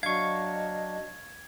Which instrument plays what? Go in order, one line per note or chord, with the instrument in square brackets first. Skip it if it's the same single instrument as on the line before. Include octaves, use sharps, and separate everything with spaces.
[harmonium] F#3 D4 [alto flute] D#5 [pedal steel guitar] F5 C#6 [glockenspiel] G#6